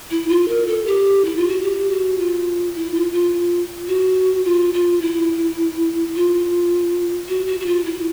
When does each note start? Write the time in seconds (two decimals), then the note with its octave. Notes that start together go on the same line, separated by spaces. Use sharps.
0.11 E4
0.29 F4
0.48 A#4
0.67 A4
0.86 G4
1.25 E4
1.37 F4
1.49 F#4
1.62 G4
1.90 F#4
2.18 F4
2.75 E4
2.94 F4
3.12 F4
3.88 F#4
4.45 F4
4.74 F4
5.01 E4
6.16 F4
7.29 F#4
7.47 F#4
7.60 F#4
7.66 F4
7.85 E4